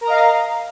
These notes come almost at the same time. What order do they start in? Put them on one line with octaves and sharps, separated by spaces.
A#4 A#5 D#5 F5